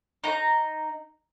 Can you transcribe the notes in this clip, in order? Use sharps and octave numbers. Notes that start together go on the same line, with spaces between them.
D#4 A#5